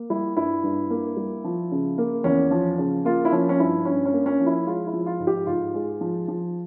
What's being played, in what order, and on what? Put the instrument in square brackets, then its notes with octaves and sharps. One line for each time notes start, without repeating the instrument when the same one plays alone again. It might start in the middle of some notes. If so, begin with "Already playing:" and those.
Already playing: [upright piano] A#3
G3 E4
G2 E4
G2
A#3
G3
F3
C#3
A#3
E2 C#4
F3
C#3
A#3 F4
E4
F3 C#4
C#4
G2 E4
G2 C#4
C#4
A#3
C#4
F3
E4
G#3 F4
E4
F3
F4
G#2
G4
G#2 F4
G#3
F3
F3